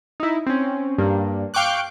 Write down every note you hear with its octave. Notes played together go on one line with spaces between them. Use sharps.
D#4 E4
C4 C#4
G2 A#3
F5 G5 C#6 D6 F#6